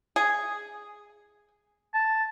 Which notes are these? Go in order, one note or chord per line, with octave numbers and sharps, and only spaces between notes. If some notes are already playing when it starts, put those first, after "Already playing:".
G#4
A5